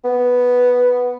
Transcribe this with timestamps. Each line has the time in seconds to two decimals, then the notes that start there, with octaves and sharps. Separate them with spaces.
0.04 B3